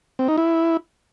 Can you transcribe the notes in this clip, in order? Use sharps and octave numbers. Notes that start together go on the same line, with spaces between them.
C4
D#4
E4